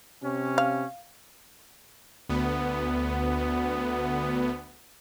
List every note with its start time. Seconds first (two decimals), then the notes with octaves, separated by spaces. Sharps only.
0.23 C3 C#4
0.58 F5
2.29 D2 B3